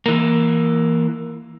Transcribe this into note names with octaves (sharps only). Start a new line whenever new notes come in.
E3 A#3